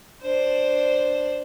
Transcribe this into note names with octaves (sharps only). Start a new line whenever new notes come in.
D4 C5